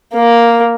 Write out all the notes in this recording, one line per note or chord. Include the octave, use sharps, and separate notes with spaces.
A#3